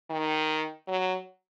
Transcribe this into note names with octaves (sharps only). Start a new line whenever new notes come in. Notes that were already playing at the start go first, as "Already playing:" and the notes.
D#3
F#3